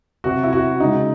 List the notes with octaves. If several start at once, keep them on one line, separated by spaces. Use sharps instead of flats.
C3 F#3 F#4
E4
F#4
C#3 G#3 D#4